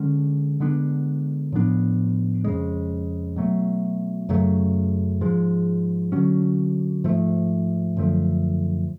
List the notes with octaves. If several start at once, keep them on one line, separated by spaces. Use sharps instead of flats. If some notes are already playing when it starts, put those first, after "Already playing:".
Already playing: D3 G#3 C#4
D3 G#3 B3 D4
A2 F3 B3 D4
F2 C#3 G#3
B2 F#3 A3
F#2 C#3 F#3 A3
G#2 F3 G#3
D3 F#3 C#4
G#2 F3 A3
F#2 D3 F3 A3